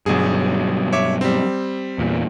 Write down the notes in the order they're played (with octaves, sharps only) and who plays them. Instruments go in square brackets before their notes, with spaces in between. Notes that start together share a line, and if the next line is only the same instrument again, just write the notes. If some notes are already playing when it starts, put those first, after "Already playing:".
[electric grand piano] G1 G#4 [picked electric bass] G2 B2 F#3
[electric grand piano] C#5 E5 D6
G3 C4
[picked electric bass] E2 A#2